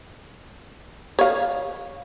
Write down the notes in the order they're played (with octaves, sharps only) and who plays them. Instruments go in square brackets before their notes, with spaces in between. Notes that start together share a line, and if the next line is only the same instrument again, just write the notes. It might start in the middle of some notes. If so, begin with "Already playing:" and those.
[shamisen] C#5 F5